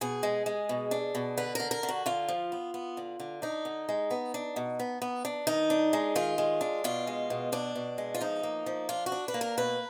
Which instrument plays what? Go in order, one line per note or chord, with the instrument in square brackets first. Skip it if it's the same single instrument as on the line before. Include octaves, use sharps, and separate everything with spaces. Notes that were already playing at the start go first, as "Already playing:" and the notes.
[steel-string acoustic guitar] B2 G#4
G#3
G#3
B2
D4
B2
D3 B4
D3 A#4
A#4
D3
F#4
D3 F4
F3
B3
B3
D3
D3
D4 D#4
D3
G#3
B3
D4
B2
B3
B3
D4
D#3 D#4
D4
G#3
D#3 F4
G#3
D4
B2 F4
G#3
B2
B2 D4
B2
G#3
F4
F3 D#4
A#3
F3
D4 F4
F#4
D4
B4
A#3
A#4
B2 B4